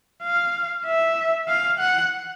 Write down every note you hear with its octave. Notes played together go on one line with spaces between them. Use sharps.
F5
E5
F5
F#5